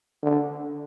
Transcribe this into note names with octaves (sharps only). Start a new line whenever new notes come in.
D3